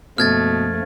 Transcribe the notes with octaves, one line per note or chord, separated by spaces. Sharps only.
F#2 B2 F3 A3 A#3 F6 G#6 A6